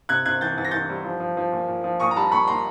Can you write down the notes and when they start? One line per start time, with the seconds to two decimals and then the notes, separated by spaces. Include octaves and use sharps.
0.09 C3 F#6 G#6
0.26 C3 F#6 G#6
0.41 E3 G6 A6
0.58 E3 A6
0.65 A#6
0.71 E3 G6 A6
0.89 G3
1.05 F3
1.20 F3
1.37 F3
1.52 A#2
1.68 A#2
1.84 F3
2.00 A#2 C#6 D#6
2.11 A#5
2.16 G3 A5 B5
2.32 A#2 B5 C#6
2.47 A#2 A#5 C6